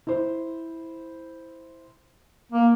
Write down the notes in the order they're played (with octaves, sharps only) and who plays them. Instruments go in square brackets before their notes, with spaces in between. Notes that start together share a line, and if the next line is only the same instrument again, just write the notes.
[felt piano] E4 C5
[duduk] A#3